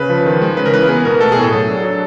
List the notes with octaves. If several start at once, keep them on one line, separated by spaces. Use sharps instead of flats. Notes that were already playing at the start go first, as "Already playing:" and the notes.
Already playing: C#3 B4
F3
D#3
G#3
C#3 B4
A#4
E3 B4
B3 G#4
B2 A#4
A3 A4
G#4
A2
A4
F#3 A4
D4
F#3